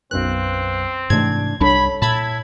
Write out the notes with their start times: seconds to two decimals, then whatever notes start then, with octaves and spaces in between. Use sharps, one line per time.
0.11 B1 F#2 C4 B4 C5 F5 F#6
1.10 G#2 C3 E3 A3 D4 G#6
1.61 C2 G3 D4 A4 C#5 B5
2.02 A#2 E4 A5 B5 G#6